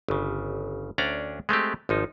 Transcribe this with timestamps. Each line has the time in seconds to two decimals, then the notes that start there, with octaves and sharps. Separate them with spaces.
0.08 G1 C#3
0.98 D2 C#4 D4 D5 A#5
1.49 G#3 A3 C4 G4
1.89 G#1 F3 D#4